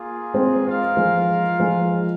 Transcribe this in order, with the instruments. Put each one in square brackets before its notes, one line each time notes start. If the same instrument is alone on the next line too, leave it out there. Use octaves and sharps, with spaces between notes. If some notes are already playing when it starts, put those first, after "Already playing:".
Already playing: [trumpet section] A#3 F4 G#4
[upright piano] G#3 C4
[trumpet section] F4 A#4 F5
[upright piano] F3 G#3
F3 G#3